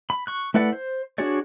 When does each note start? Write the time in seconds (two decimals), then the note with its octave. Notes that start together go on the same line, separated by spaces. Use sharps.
0.10 B5
0.27 C#6 F#6
0.54 A3 E4 B4 D5 F#5
0.73 C5
1.18 D4 F#4 G#4 C#5 D5